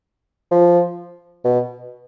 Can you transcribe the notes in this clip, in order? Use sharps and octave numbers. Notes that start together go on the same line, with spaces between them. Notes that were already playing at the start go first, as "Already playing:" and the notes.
F3
B2